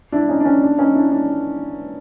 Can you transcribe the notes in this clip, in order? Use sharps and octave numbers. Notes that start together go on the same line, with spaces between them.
D4 E4
C#4 D#4
D4
C#4
D4
C#4 D#4
D4 E4
D4